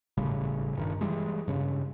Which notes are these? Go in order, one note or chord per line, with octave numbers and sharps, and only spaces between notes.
G#1 A2 C#3 G3
D#1 G2 D#3
E3 G3 G#3
G2 C#3